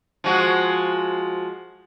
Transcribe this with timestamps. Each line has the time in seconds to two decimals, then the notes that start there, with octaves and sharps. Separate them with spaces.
0.24 F3 G#3 F#4